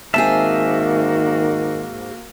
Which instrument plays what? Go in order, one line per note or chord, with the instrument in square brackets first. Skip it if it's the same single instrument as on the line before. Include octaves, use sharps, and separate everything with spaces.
[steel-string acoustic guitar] G#2 C4 G#4 [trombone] D#3 [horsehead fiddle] A#3 F#4 [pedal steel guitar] E5 A5